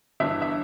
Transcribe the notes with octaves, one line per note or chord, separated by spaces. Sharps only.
G1 G2 E3 E5
E5